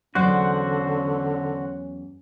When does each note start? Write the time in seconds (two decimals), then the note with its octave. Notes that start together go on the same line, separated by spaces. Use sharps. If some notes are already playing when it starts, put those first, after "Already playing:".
0.15 E2 D3 F#3 C#4 F#4 C5 D5 F#5